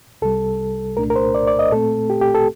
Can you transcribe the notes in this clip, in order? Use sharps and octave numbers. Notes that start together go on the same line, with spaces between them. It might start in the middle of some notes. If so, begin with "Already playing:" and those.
C2 C3 G3 A4
C2 A#2 A3 D4 A#4
A#4
C5
D5
D5
D#5
A#2 A3 C4 A4
G4
G4
A4